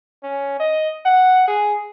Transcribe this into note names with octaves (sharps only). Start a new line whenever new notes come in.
C#4
D#5
F#5
G#4